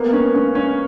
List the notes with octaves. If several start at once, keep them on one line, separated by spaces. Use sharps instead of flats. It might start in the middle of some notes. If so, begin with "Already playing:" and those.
Already playing: A#3 B3
C#4
C#4
C#4